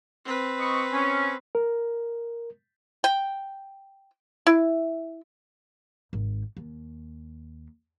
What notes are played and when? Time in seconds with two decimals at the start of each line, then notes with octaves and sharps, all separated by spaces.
0.25 C4 B4
0.59 D#5 B5 C#6
0.92 C#4
1.55 A#4
3.04 G5
4.47 E4
6.13 G#1
6.57 D#2